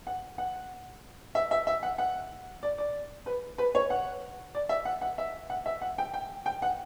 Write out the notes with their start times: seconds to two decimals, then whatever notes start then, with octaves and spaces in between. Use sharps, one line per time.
0.07 F#5
0.38 F#5
1.35 E5
1.51 E5
1.67 E5
1.83 F#5
1.98 F#5
2.63 D5
2.78 D5
3.26 B4
3.58 B4
3.75 C#5
3.90 F#5
4.55 D5
4.69 E5
4.85 F#5
5.01 F#5
5.18 E5
5.50 F#5
5.66 E5
5.81 F#5
5.98 G5
6.14 G5
6.46 G5
6.62 F#5